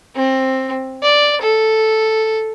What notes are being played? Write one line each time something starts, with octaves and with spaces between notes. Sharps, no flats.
C4
D5
A4